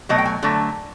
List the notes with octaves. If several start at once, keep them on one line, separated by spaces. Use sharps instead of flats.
B2 F#3 A3 D#5
G5
G#5
D3 F#3 A3